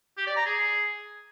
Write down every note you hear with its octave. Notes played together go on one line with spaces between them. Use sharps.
G4
D5
A#5
G#4